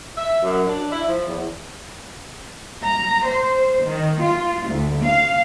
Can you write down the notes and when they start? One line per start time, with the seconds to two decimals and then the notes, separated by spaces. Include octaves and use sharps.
0.18 E5
0.43 F#2
0.67 D4
0.91 E4
1.08 F3
1.27 E2
2.82 A#5
3.26 C5
3.84 D#3
4.22 F4
4.67 D2
5.03 F5